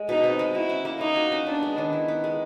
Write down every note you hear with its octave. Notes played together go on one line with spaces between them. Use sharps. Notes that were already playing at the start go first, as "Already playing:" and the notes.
Already playing: G#3
B2 D#4
C4
G#3
E4 F#4
C#4
A#3
A#3 D#4
F#4
C#4
B3 D4
G#3
D#3
E4
B3
G#3